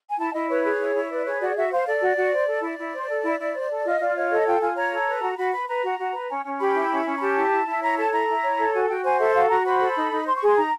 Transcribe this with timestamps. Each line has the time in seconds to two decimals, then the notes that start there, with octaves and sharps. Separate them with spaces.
0.09 G#5
0.18 E4 A5
0.34 E4 D#5
0.49 B4 C#5
0.64 G#4
0.80 E4
0.95 E4
1.10 B4 D5
1.25 G#4 C#5
1.41 F#4 D5
1.56 F#4 E5
1.71 C5 F5
1.86 A4 D5
2.02 F#4
2.17 F#4
2.32 C5
2.48 A4
2.63 E4 D5
2.78 E4
2.93 C5
3.09 A4
3.24 E4
3.39 E4
3.54 C5
3.70 A4
3.85 F4 D#5
4.00 F4 D5
4.16 C#5 D#5
4.30 A4 D#5
4.46 F4 G5
4.61 F4 G#5
4.77 C#5 A#5
4.92 A4
5.08 B4
5.22 F#4
5.38 F#4 B5
5.52 B4 B5
5.68 B4 A#5
5.83 F#4
5.99 F#4
6.14 B4
6.29 C#4
6.45 C#4
6.60 G4 B5
6.75 E4
6.90 C#4
7.05 C#4
7.16 A#5
7.21 G4 A5
7.36 E4
7.51 E4
7.67 E4
7.81 C#5 A#5
7.98 A4 A5
8.12 E4 A#5
8.28 E4
8.43 C#5
8.58 A4
8.73 F#4 G#5
8.89 F#4 G5
9.04 C5 G#5
9.19 A4 E5
9.34 F#4 F5
9.50 F#4 A#5
9.65 C5 B5
9.80 A4
9.95 D#4
10.11 D#4
10.26 C5 C6
10.36 C#6
10.42 G#4
10.47 C6
10.57 D#4 A#5